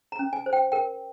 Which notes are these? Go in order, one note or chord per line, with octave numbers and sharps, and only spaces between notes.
A#5
C#4
G#5
C5
G5
A#4 G5